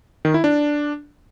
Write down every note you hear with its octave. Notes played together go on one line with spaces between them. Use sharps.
D#3
E4
D4